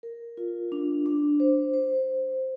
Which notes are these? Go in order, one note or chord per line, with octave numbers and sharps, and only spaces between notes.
A#4
F4
D4
D4
C5
C5